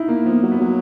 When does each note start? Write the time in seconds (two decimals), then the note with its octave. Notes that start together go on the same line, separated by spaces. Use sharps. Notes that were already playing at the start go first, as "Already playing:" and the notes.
Already playing: D#4 E4
0.08 A#3
0.25 F3 B3
0.43 F#3
0.52 B3
0.61 F#3